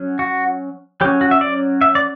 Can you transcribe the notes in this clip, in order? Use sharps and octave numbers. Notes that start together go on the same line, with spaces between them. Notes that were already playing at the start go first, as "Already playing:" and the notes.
Already playing: F#3 C#4
F#4
F#3 C#4 G4
F#4
E5
D5
E5
D5